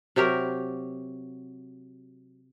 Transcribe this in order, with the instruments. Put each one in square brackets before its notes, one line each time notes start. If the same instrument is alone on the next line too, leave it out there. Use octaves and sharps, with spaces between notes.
[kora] C3 F#3 G4 A#4